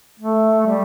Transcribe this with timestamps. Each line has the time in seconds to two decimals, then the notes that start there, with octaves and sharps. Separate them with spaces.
0.19 A3
0.66 G3